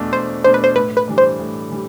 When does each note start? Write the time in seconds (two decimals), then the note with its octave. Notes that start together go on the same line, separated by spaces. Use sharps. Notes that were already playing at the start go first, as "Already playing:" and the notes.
Already playing: E2 B2 A3 D4
0.13 E2 C5
0.44 B2 A3 D4 C5
0.54 B4
0.64 C5
0.76 A2 B4
0.97 B4
1.08 E3 G3 D4
1.18 C5
1.39 A2
1.71 E3 G3